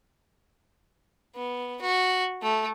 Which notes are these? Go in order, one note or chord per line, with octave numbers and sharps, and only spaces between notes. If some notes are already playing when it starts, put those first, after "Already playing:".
B3
F#4
A3